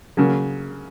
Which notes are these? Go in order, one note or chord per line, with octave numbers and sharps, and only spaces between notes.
C#3 F#3 A#3